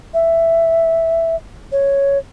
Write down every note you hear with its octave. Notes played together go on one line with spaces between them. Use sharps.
E5
C#5